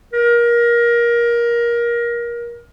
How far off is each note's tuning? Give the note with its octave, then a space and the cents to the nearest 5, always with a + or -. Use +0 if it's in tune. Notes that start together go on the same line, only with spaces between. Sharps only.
A#4 +20